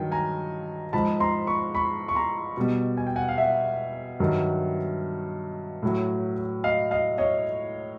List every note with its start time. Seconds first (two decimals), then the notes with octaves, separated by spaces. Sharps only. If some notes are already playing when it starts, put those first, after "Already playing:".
Already playing: G2 D#3 F#3 G5
0.12 G#5 A#5
0.93 G#2 F3 A5 B5
1.20 A#5 C6
1.47 B5 C#6
1.75 B5 C#6
2.08 C#6
2.15 A#5 C6
2.57 B2 G3
2.97 G#5
3.07 G5
3.16 F#5 G#5
3.29 F5
3.38 E5 F#5
4.20 G2 D#3 F#3
5.83 A2 F#3
6.64 D#5 F5
6.91 D#5 F5
7.18 C#5 D#5